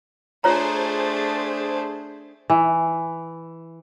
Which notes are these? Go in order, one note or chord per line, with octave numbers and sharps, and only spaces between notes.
A3 D4 F4 G#4 C5 C#5 A#5
E3